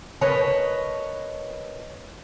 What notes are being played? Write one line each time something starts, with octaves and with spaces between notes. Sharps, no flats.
A#4 B4 C#5 D#5 A5